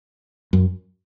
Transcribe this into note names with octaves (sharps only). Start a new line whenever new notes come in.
F#2